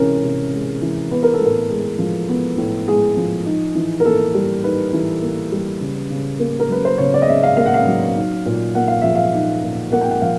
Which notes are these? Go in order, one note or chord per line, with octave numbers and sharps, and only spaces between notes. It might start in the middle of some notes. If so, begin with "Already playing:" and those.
Already playing: C3 E3 G#3 C#4 A#4
C3
G#3
E3
B3 B4
A#4
A4
A2 A#4
G#3
F3
B3
A2
G#3 G#4
F3
D#4
E3
A#4
A#3 A4
G3
D#4 B4
E3
A#3
G3
C#3
C#3
A#3
A#4
F#3 B4
C5
C#3 C#5
D5
D#5
C#3 E5
F5
A#3 F5
F#5
F5
F#3
D#4
A#2
A#3 F#5
F5
F3 E5
F5
D#4
A#2
A#3 F#5
G5
F#5
F3 F5